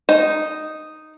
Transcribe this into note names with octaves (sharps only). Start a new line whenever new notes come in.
D#4